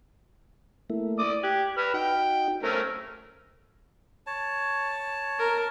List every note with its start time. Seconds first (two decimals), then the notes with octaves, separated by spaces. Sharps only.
0.90 A3 A#3 E4
1.19 D5 D6 D#6
1.43 G4 D6 F#6 G#6
1.77 B4 E6 F6
1.94 D#4 F#4 G5
2.63 A3 C#4 A#4 C5 A#5
4.27 C#5 A5
5.39 A#4